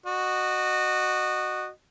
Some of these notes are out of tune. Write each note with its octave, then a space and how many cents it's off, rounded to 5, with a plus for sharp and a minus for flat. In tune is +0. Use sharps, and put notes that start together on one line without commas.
F#4 +0 D#5 -30